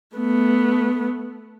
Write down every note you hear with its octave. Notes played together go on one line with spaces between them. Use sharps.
A3 B3